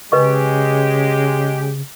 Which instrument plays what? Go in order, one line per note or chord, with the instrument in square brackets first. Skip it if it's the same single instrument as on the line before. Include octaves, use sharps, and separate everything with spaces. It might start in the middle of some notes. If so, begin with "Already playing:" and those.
[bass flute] C#3 [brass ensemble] G#3 G4 [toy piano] B4 D#5 C#6